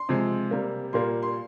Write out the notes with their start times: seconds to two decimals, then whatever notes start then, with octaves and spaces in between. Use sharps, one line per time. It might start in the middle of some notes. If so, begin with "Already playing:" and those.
Already playing: C6
0.09 C3 F3 G#3
0.51 C3 G3 A#3
0.93 A#2 G3 A#3 C6
1.23 C6